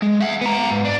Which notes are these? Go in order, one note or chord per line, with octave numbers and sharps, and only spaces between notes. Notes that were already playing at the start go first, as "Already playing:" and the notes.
G#3
E5 F#5
B3 A#5
G#2
D4